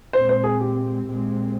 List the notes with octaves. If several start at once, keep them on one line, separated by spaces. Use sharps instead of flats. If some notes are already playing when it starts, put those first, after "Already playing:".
A#2 G#3 C4 C5
C5
G#4
G4
A#2 G#3 C4